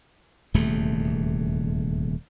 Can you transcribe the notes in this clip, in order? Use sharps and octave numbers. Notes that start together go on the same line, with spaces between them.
D#1 E2 C3 A3